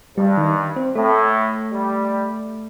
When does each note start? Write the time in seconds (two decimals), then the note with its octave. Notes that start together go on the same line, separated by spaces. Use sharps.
0.18 G2 G3
0.37 D#3
0.76 C4
0.95 A2 A3
1.73 G3